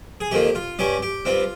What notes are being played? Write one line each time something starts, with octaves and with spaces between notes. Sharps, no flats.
G#4
F2 D#3 A#3 F4 G4
F4
G2 G3 C#4 G4
G4
G2 G3 C4 F4